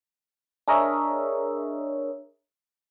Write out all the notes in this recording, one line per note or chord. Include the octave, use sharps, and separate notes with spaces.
D4 G#4 A#4 C#5 D#5 E5